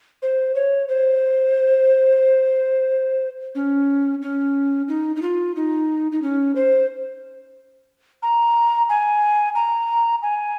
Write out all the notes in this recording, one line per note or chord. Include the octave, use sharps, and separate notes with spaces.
C5
C#5
C5
C#4
C#4
D#4
D#4
F4
D#4
D#4
C#4
C5
A#5
G#5
A#5
G#5